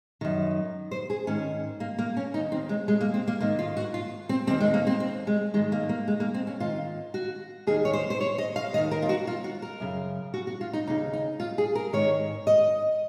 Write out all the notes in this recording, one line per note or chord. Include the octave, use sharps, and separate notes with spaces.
F#2 D#3
C5
G#4
G#2 D#3 C#4
A#3
A#3
C#4
D#2 D#3 D#4
C4
G#3
G#3
A#3
C4
A#3
G#2 D#3 A#3
F4
F#4
F4
C4
D#2 D#3 C4
G#3
A#3
C4
C4
G#3
G#2 D#3 G#3
A#3
A#3
G#3
A#3
C4
C#4
G#2 D#3 F4
F#4
D#2 D#3 G#4
C#5
C5
C5
C#5
D#5
F5
D#2 D#3 D#5
A#4
F4
F#4
F4
F#4
A#4
F#2 C#3
F#4
F#4
F4
D#4
D#2 C#3 D#4
D#4
F4
G#4
A#4
G#2 D#3 C#5
D#5